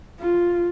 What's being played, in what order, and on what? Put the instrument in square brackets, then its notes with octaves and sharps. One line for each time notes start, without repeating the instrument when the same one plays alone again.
[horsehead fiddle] F4